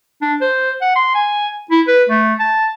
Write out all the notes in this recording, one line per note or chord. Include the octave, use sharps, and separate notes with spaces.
D4
C5
F#5
C6
G#5
E4
B4
A3
A5